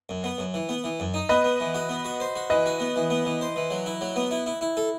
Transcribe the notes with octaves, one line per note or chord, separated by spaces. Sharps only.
F#2
B3
F#2
E3
B3
E3
F#2
D#4
B3 B4 D#5
B3
E3
F#4
B3
F#4
C5
F#4
E3 B4 D#5
F#4
B3
E3
B3
E3
C5
E3
F#3
E4
F#3
B3
E4
E4
E4
A4